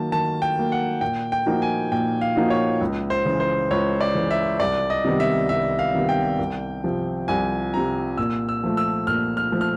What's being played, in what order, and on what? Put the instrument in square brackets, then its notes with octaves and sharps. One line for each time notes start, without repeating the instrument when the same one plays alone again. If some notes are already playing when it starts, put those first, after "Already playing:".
Already playing: [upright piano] D#3 F#3 A#3 [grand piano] A5
[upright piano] D#3 [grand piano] A5
[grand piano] G5
[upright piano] F#3 A#3
[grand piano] F#5
[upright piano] A#2 [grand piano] G5
[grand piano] G5
[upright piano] F3 A#3 D#4 F#4
[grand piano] G#5
[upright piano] A#2 [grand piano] G5
[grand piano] F5
[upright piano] F3 A#3 D#4 F#4
[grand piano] C#5
[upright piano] C#2
[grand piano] C5
[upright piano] C#3 E3
[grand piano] C5
[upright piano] C#2 [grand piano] C#5
[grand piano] D5
[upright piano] C#3 E3
[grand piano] E5
[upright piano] C2 [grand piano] D5
[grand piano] D#5
[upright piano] C3 D#3 G3 B3
[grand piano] E5
[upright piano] C2 [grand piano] E5
[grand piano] F5
[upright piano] C3 D#3 G3 B3
[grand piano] G5
[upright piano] C2
C3 F3
[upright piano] C2 [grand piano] G#5
[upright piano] C3 F3 [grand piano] A#5
[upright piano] A#2 [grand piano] E6
[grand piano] E6
[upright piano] F3 A3
[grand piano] E6
[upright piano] A#2 [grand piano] F6
[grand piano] F6
[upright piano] F3 A3
[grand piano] F6